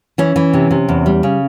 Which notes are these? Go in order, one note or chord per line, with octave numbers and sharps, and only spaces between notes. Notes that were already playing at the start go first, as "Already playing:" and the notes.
E3 C#4
E3
C3
C3
E2
G3
C#3